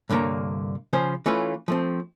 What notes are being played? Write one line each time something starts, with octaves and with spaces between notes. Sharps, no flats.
C2 G2 D3 A#3 C#5 A#5
C#3 F3 C#4 C5
E3 A3 C#4 F4 B4
F3 A3 C4